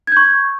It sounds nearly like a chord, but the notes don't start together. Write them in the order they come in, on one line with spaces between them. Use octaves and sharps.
G#6 G6 C#6